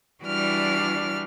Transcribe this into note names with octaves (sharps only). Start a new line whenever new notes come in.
E3 G3 D4 F#4 F6